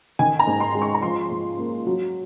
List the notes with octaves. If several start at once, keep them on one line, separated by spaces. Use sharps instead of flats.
D#3 G#5
A#5
G#2
C6
G#3
C#6
A#5
F3 C6
G#2
A#3
F#3